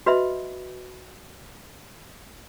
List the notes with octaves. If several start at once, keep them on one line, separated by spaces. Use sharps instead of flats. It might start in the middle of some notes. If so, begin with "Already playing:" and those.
F#4 B4 D#5 E5 B5